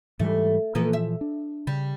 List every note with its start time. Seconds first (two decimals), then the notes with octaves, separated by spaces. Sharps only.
0.20 G#2 E3 G3 A3
0.75 A#2 E3 F3 A#3 B3 A4
0.93 E5
1.21 D4
1.67 C#3 G3